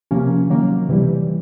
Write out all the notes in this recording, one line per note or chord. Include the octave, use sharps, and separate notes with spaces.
C3 F3 A#3 C#4
D#3 F#3 A#3
C3 E3 G3